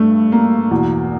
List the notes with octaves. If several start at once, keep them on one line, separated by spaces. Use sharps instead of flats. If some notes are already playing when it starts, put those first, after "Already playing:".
Already playing: G2 A3
A#3
E2 B2